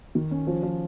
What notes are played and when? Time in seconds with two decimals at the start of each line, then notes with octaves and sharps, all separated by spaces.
0.15 D#3
0.31 C#4
0.47 F3
0.63 F3